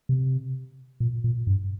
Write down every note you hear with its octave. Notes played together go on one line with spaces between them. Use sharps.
C3
A#2
A#2
G2